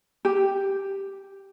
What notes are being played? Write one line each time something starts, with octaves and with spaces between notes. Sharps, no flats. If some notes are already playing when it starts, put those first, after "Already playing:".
G4